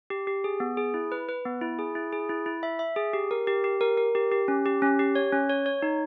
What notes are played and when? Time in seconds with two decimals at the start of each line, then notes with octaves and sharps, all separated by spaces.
0.10 G4
0.27 G4
0.44 G#4
0.60 B3
0.77 G#4
0.94 E4
1.12 B4
1.29 B4
1.45 B3
1.61 E4
1.79 G#4
1.95 E4
2.12 G#4
2.29 E4
2.46 E4
2.63 E5
2.79 E5
2.96 G#4
3.13 G4
3.31 A#4
3.47 G4
3.64 G4
3.81 A#4
3.98 A#4
4.15 G4
4.32 G4
4.48 C#4
4.66 G4
4.82 C#4
4.99 G4
5.15 C#5
5.32 C#4
5.49 C#5
5.66 C#5
5.82 D#4